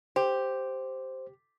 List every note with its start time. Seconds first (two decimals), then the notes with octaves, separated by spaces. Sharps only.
0.16 G4 C5